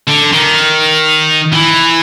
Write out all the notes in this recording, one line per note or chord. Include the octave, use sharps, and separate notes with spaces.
D3
D#3
E3